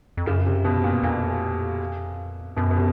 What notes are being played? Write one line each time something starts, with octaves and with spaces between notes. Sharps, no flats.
F2
F#2 C#3
C3
B2
A#2
F2 A#2
F#2 B2
B2
C3